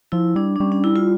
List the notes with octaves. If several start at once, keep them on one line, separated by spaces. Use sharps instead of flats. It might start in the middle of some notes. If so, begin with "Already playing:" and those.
F3 E4
G3 D4
D4
G3 C#4
D4
E4
F4